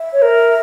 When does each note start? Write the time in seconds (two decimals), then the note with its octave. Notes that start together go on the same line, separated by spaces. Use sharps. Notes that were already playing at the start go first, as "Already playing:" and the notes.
Already playing: E5
0.13 C#5
0.22 A#4